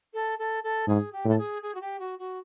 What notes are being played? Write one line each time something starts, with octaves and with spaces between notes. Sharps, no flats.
A4
A4
A4
G#2 G#4
G4
A2 A4
G#4
G#4
F#4
G4
F#4
F#4